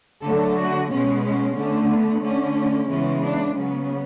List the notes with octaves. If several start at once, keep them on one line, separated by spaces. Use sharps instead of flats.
D3 F#3 A3 A4
F#4
B2 G#3 B3 C#4
C#4
D3 A3 C#4
B3
D3 A3 C#4
C#3 E3 G#3 B3 C#4
D4
C#3 F#3 B3 C#4